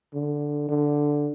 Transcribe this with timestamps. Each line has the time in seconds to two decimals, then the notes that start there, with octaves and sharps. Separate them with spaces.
0.14 D3
0.69 D3